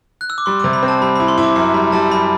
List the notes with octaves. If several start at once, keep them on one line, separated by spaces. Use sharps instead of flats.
F#6
E6
D6
G3 C6
C3 D6
B5
C4
A5
G3 B5
E4 B5
C6
E4
D6
F#2 C6
G3 B5
G3 A5
F#2 B5